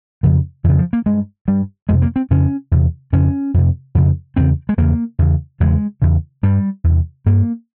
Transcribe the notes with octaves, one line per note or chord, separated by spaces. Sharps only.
F2 C#3 F3
F2 C#3 E3
F3
A#3
G2 G#3
G2 G3
F2 C3 G#3
A#3
C4
F2 C#3 C#4
E2 C3
F2 C#3 C#4
F2 C3
F2 C#3
E2 C#3 C4
G#3
E2 C#3 A#3
E2 C#3
E2 C#3 G#3
E2 C#3
G2 G3
E2
C3
G2 A#3